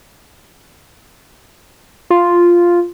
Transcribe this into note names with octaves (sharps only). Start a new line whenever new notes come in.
F4